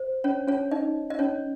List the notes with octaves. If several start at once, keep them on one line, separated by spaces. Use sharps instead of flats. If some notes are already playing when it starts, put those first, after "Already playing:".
Already playing: C5
C#4 C#5
C#4 C#5
D#4 D#5
D#5
C#4 C#5